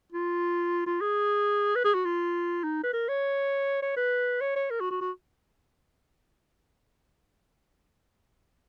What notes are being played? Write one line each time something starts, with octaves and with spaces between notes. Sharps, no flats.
F4
F4
G#4
B4
G#4
F#4
F4
D#4
B4
A#4
C#5
C#5
B4
C#5
C#5
A#4
F#4
F#4
F#4